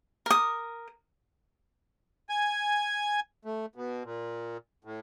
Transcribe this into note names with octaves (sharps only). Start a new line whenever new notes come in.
A#4 D#6
G#5
A3
B2
A#2
A2